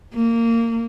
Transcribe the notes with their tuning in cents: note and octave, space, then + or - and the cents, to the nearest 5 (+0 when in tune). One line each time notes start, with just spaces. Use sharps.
A#3 -20